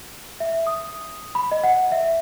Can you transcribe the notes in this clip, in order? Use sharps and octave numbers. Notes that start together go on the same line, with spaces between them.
E5
D#6
B5
D#5
F#5
E5